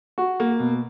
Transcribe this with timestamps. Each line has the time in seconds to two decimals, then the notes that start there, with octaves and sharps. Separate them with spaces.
0.18 F#4
0.40 A#3
0.60 B2